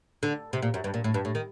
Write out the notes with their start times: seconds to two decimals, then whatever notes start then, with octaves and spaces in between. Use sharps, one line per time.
0.23 D3
0.53 C3
0.62 A#2
0.74 F#2
0.84 G2
0.94 A#2
1.04 A2
1.14 G2
1.25 A2
1.35 D#3